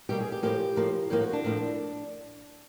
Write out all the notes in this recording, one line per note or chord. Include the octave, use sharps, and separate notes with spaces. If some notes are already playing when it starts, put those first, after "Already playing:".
B2 G3 A#3 G4
G#4
G4
A2 F3 A#3 G4
A2 F3 A#3
A2 F3 A#3 G4
F#4
D4
A2 F3 A#3